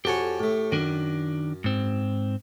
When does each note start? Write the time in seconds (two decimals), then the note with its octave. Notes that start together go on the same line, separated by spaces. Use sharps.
0.05 F2 F#4 G4 A4 C#5 G#5
0.40 A2 A3
0.72 F#2 D#3 D4
1.64 G#2 C4